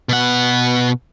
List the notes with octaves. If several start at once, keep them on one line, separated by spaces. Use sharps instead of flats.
B2 F#5